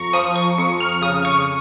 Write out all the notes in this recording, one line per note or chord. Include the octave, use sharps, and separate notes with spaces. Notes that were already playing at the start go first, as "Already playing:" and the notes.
Already playing: F2 A#5 C#6
F3 D#6
C#6
F2 C#6
F6
C#3 D#6
C#6